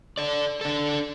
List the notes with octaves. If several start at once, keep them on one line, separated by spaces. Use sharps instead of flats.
A4 D5
D4 A4